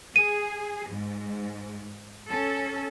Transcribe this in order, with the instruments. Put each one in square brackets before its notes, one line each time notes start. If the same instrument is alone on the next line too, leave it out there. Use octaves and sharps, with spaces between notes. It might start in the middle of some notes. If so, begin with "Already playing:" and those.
[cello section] G#4 [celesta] D#7
[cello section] G#2
C#4 A4